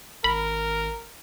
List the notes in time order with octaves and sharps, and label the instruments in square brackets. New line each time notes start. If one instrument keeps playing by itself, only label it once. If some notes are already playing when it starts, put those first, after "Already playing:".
[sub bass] G#1 [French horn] A#4 [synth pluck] B5